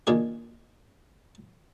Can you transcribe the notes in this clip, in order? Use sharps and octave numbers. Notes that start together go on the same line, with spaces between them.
A#2 D#3 A#3 D4 G#4